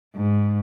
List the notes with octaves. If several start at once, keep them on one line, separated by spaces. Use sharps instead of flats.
G#2